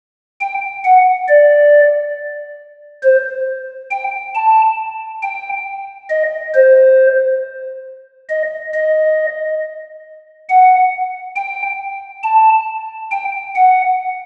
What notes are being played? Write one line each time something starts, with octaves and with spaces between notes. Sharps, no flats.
G5
F#5
D5
C5
G5
A5
G5
D#5
C5
D#5
D#5
F#5
G5
A5
G5
F#5